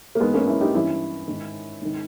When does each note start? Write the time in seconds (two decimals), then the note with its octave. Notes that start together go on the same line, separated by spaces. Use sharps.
0.15 A#3
0.20 G#2 E3 G#3 B3
0.34 A#3 C#4
0.47 C#4 E4
0.61 D#4 G4
0.74 G2 E3 C#4 E4
1.28 G#2 D#3
1.82 G#2 D#3